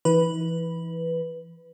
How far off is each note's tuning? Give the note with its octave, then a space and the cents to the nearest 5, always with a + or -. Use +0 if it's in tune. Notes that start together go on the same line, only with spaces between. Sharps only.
E3 +20 E4 -45 B4 +0